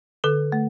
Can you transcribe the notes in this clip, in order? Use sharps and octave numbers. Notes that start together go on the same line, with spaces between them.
D3 A4
A3